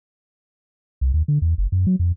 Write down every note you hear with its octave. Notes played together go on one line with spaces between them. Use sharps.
C2
D#2
D3
E2
F#1
F#2
F#3
F2